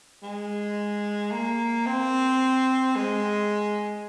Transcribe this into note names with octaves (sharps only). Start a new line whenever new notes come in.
G#3
A#3
C4
G#3